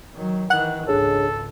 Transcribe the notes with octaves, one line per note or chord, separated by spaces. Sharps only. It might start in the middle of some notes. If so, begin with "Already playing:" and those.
D#3 F#3
D#3 E3 F#5 F#6
G#1 C#2 D4 G#4 A4 C#5